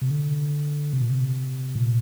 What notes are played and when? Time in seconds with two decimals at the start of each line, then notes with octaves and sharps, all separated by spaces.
0.02 C3
0.10 D3
0.93 C3
1.01 A#2
1.09 C3
1.75 A#2